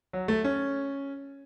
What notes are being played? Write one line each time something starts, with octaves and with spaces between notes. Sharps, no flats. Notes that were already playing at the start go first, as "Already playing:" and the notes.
F#3
A3
C#4